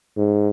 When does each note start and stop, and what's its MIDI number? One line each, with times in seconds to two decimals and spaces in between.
0.17 0.49 44